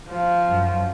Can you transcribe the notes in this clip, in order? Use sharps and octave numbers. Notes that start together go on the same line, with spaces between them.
F3
F#2